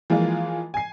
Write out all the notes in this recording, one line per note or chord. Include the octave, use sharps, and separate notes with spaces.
E3 F3 G#3 A#3 F4
G#5 C7